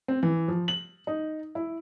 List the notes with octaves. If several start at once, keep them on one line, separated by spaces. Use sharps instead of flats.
C4
E3
F3
F#7
D#4
E4